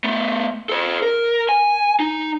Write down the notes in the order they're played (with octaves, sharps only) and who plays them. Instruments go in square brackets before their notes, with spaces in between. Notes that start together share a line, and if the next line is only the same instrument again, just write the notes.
[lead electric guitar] A3 B3
A4 C5
A#4
G#5
D#4